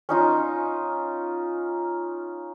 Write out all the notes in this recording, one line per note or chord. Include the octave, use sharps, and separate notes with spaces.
C#4 D#4 F4